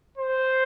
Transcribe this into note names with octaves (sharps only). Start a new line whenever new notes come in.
C5